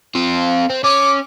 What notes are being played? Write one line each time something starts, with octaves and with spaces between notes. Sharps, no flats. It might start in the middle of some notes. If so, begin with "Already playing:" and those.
C4 F4
C4
C#4 D6